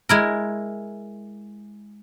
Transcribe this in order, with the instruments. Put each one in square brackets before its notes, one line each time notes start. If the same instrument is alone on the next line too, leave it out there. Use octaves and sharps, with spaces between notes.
[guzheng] G#3 E4 A#4